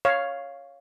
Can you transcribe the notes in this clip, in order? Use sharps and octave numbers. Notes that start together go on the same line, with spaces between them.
C#5 F5